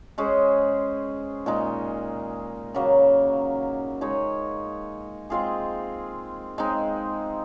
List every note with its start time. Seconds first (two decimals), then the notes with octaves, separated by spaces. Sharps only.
0.18 G#3 C#4 G#4 C5
1.46 A#2 G#3 D#4
2.74 C#3 F#3 A#3
4.01 G#3 D#4 G#4 C#5
5.30 G#3 C4 F4 G#4
6.58 G#3 C4 D#4